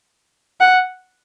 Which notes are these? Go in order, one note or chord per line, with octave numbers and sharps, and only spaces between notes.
F#5